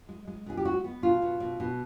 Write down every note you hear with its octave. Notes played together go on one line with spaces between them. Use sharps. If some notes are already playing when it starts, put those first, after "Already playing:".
G#3
G#3
B2 G#4
G4
G#3 F#4
B3
B2 F4
B2
B2
B2